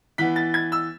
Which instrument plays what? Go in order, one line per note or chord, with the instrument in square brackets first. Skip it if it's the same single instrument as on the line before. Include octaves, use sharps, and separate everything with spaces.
[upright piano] E3 B3 B6
A6
G#6
E6